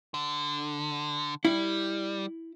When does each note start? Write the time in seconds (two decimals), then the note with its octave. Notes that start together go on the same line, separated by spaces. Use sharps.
0.14 D3
1.45 G3 E4